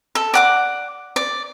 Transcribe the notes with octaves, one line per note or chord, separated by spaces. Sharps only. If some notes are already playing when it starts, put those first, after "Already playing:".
A4
D5 F#5 D6
D5